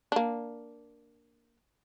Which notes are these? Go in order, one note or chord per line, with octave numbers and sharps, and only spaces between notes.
A#3 D4